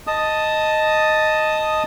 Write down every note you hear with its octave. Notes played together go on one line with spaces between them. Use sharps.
D#5 A5 D#6